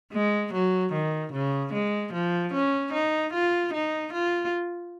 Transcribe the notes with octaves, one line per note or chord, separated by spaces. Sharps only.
G#3
F#3
D#3
C#3
G#3
F3
C#4
D#4
F4
D#4
F4